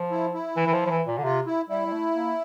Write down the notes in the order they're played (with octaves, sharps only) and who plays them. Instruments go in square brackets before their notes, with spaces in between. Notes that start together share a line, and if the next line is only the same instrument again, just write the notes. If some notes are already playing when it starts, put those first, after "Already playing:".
Already playing: [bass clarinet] F3
[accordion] E4
E4
[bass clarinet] E3
E3
F3
F3
E3
A#2
D3
[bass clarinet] C3 [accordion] F4
[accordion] E4
[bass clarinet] G3 [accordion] E4
[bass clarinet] G3
A3
A#3